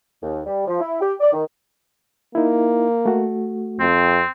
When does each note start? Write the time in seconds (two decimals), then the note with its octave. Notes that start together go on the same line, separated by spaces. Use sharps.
0.22 D#2
0.46 G3
0.67 F3
0.81 E4
1.01 G4
1.20 D5
1.33 D#3
2.35 A#3 D#4 E4
3.06 A3 F#4
3.80 F2 C4